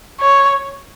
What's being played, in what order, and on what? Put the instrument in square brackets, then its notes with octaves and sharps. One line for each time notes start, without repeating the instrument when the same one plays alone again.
[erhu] C#5